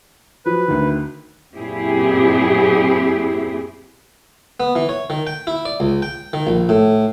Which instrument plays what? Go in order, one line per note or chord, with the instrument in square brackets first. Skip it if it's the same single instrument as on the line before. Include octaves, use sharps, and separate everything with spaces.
[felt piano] F3 F#3 [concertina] B4
[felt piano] D2 D#3
[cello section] F#2 A#2 C4 E4 G4 G#4
[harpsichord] B3
E3
C#5
D#3
G5
E4
D5
C#2
G5
D#3
A#1
A2